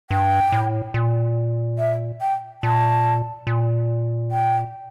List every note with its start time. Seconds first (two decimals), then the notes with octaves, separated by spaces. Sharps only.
0.10 G2 G5
0.52 A2
0.94 A#2
1.78 E5
2.21 G5
2.63 A#2 A5
3.47 A#2
4.31 G5